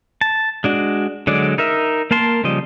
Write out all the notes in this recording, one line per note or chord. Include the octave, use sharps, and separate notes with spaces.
A5
G#3 D4 F#4
D3 F#3 G#3 D5
D#4 A#4 E5
A#3 A#4 A5 C6
C#3 F3 G3 D#5